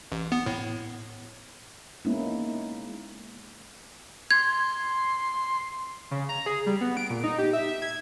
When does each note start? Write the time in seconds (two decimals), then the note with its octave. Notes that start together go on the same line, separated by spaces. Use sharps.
0.12 A1
0.32 B3
0.46 A2
2.05 G#3 A#3 B3 C#4 D#4 E4
4.31 C6 G#6
6.11 C#3
6.29 A#5
6.46 G#4
6.66 G3
6.81 B3
6.97 D7
7.10 A#2
7.24 D#4
7.38 G4
7.53 E5
7.68 E5
7.82 G#6